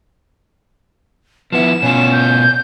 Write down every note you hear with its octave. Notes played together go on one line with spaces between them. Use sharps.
F3 B3 E4 E7
B2 C#4 F4
G6